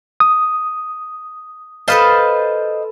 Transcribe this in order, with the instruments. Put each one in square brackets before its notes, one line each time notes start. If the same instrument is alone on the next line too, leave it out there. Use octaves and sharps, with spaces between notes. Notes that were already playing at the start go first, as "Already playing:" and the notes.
[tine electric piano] D#6
[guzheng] A4 B4 A5 [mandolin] C5 D#5 F5